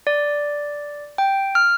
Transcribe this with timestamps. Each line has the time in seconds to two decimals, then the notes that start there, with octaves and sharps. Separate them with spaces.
0.07 D5
1.18 G5
1.55 F6